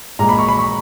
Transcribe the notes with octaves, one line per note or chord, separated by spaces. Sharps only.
A#2 G#3 A#5
B5
C#6
B5
C#6